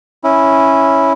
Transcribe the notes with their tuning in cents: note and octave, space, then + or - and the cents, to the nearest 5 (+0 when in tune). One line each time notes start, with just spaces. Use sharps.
C#4 -5 E4 -5